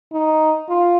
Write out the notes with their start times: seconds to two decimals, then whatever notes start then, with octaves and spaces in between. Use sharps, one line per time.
0.13 D#4
0.69 F4